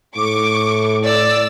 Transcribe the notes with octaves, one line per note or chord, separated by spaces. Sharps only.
A2 C#6 D6
D5 E6